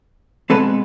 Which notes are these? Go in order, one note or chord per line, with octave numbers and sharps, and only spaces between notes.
B2 G#3 C4 A4 B4